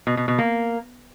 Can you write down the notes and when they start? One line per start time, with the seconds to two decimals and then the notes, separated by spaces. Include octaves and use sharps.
0.07 B2
0.17 B2
0.28 B2
0.39 A#3